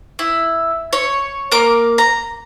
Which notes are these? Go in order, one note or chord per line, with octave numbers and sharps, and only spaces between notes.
E4
C#5
A#3 A#4 D6
A#5